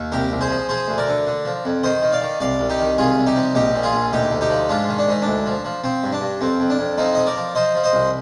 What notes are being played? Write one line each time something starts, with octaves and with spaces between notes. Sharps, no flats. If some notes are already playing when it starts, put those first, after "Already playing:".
Already playing: D#2
C2 G4 A#4
C2
G#4 C5
F3
F3 G#4 C5
D2
A#4 D5
D3
D3
F3
F2
D#3 C5 D#5
D#3
D5 F5
D#3
C2 D5 F5
C2
D#4 G4
D#3
C2 F4 G#4
C2
D#4 G4
F3
A#1 D#4 G4
A#2
F4 G#4
A#1
D2 D#4 G4
D2
D#4 G4
F3
G#2 D4 F4
D#3
D4
G#2 D#4
D2 D4
F3
F3
F3 C4
G2
D4
G2
F2 C4
F2
D4
F2
F3 C4 D#4
F3 D#5
A#4 D5
F3
F3 C5 D#5
F3
C5 D#5
C2